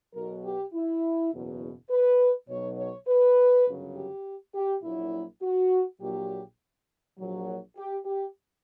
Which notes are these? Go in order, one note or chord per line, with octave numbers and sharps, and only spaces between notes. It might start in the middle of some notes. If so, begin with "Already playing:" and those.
B1 B2 F#3 A#4
G4
E4
F#1 E2 B2 F#3
B4
B1 B2 F#3 C#5
C#5
B4
G1 F#2 C#3 F#3
G4
G4
A#1 A#2 F#3 E4
F#4
A#1 A#2 F#3 G4
A#1 A#2 F#3
G4
G4